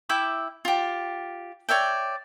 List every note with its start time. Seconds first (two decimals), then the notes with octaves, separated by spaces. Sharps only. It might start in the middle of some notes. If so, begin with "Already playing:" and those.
0.09 E4 E5 G5 D6
0.65 F4 G4
1.69 C#5 D5 E5 G5